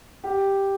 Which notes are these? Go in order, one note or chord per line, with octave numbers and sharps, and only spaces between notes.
G4